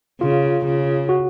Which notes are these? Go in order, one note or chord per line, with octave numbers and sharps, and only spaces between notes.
C#3 F4
C#3
F#4